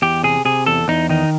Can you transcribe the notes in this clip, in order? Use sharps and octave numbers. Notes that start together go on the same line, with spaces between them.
E2 G4
C3 G#4
C3 G#4
E2 A4
E2 D#4
D#3 D#4